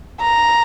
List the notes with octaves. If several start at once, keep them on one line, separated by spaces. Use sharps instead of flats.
A#5